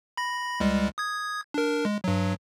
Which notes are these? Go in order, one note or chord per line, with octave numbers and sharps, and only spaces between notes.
B5 A#6
C#2 G3 G#3
D#6 G#6
D4 A#4
G#3
G2 F#3